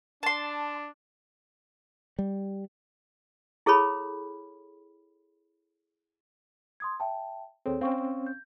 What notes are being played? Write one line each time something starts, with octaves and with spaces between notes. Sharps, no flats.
D4 A5 C6
G3
E4 G#4 A4 C#5 B5
C6 D#6 G#6
E5 G5 A5
D#2 C4 G#4 A4 C#5
C4 C#4 F5 C#6
G6